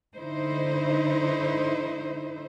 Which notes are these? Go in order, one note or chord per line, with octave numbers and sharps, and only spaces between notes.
D3 D#4 E4 C5